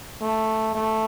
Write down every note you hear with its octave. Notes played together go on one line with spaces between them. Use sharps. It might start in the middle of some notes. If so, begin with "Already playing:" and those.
A3
A3